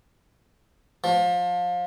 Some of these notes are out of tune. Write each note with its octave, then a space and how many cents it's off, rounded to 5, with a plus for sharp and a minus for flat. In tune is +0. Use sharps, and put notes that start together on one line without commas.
F3 +25